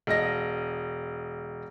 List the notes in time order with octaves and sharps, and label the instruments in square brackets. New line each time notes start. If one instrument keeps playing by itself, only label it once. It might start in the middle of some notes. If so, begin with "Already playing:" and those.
[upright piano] E1 D#5 A#6